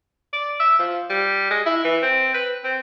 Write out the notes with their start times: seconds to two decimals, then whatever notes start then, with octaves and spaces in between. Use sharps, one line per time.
0.33 D5
0.60 E5
0.79 F3
1.10 G3
1.50 G#3
1.66 E4
1.84 E3
2.02 C4
2.34 B4
2.64 C4